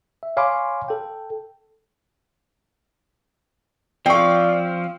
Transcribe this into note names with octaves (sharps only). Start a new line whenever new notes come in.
E5
C#5 F5 G#5 B5 C6 D6
A4 G5
F3 C4 D5 F5 G5 C#6